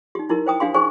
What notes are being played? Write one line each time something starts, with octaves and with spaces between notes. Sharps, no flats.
D#4 G4
D#4 E4 G4 A#4
C5 G5 D#6
D4 G4 F5 G#5 C6
D#4 G#4 C5 G#5 C#6